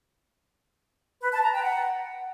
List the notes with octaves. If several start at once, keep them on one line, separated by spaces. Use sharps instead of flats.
B4
A5
A#5
G5
F#5